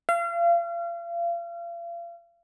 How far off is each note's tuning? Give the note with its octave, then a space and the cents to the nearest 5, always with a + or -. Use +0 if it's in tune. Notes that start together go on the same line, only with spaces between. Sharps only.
F5 -35